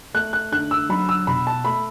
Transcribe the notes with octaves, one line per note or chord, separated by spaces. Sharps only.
A3 F#6
F#6
D3 F#6
E6
F#3 B5
E6
B2 B5
A5
A3 B5